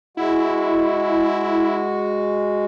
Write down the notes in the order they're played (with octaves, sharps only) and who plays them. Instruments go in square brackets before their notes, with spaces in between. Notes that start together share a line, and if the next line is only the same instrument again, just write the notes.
[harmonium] G#3 F#4 [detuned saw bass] E4